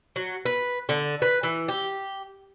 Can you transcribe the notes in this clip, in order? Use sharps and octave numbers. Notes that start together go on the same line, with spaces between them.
F#3
B4
D3
B4
E3
G4